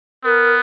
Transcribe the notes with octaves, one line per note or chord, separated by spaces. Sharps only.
B3 A#4